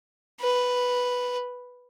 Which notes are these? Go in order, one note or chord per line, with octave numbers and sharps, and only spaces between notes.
B4